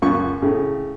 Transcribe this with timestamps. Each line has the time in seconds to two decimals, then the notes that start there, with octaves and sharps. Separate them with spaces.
0.02 C#2 F#2 F4 C#6
0.42 A2 C#3